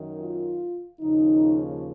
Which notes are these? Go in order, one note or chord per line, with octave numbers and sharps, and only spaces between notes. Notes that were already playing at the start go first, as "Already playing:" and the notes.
Already playing: F#2 D#3
F4
D#2 C#3 F3 D#4